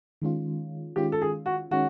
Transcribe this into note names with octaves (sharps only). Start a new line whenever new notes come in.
D#3 G#3 C#4 F4
D#3 G#3 C#4 F4 G4
A4
G#4
F#4
D#3 G#3 C#4 F#4